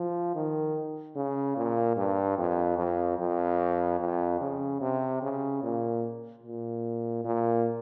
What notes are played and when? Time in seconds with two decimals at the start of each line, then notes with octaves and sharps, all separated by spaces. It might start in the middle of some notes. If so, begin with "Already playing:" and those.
Already playing: F3
0.35 D#3
1.16 C#3
1.56 A#2
1.97 G2
2.38 F2
2.78 F2
3.19 F2
4.00 F2
4.41 C#3
4.81 C3
5.22 C#3
5.63 A#2
6.43 A#2
7.25 A#2